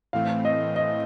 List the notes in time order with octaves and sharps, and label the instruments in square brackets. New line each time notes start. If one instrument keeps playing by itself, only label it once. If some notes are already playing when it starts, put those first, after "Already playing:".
[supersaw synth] A2 E3 A3 C4 [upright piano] F5
[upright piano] D#5
D#5